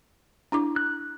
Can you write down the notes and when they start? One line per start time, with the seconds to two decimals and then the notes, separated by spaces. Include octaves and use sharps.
0.52 D4 E4 D6
0.76 F#6